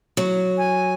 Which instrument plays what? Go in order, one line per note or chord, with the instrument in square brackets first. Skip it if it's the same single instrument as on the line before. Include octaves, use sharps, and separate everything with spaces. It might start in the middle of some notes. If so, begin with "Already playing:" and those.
[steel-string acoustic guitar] F#3
[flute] G#5